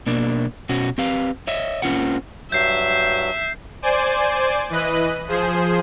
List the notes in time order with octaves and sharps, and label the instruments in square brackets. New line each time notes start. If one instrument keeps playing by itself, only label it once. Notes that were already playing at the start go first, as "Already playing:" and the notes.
[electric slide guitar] B2 A#3 D4
B2 C#4 F#4
C4 G4 B4 F5
C#5 D#5 E5
A#3 C4 C#4 F4 G#4 F#5
[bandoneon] G2 F#3 [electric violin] E5 [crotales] G6 C7
[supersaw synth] C5 D5 G#5 D6
E3 B4 D#5 F#6 D#7
F3 G#4 C5